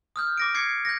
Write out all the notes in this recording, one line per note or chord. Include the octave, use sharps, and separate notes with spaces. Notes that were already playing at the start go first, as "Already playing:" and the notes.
D#6 F6 G6
D6 A#6 D7
D6 G#6 C7 C#7
G6 A#6